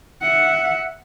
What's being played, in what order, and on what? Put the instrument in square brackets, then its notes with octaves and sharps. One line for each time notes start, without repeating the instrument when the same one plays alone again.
[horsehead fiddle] E5 F#5